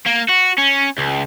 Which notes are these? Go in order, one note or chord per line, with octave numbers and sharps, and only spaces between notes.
A#3
F#4
C#4
C#2